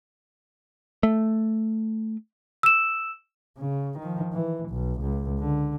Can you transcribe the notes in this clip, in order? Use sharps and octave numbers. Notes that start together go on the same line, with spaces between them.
A3
E6 E7
C#3
D#3 F3
E3
B1
C#2
D3